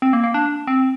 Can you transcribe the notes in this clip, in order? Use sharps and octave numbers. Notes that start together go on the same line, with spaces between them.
C4
A#3
A#3
D4
C4